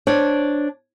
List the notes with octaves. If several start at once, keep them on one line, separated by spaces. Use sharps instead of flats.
D4 C5 C#5